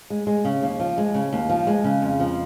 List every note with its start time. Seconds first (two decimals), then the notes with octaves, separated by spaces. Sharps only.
0.10 G#3
0.27 G#3
0.45 C#3
0.63 D#2
0.80 F3
0.98 G#3
1.14 C#3
1.33 D#2
1.50 F3
1.67 G#3
1.84 C#3
2.02 F2
2.20 F3